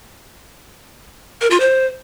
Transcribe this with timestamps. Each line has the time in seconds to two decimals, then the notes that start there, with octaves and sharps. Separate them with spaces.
1.41 A#4
1.50 F4
1.60 C5